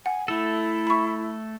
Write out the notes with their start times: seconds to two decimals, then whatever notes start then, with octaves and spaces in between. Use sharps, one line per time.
0.06 F#5 G#5
0.28 A3 E4 A4
0.87 B5 C#6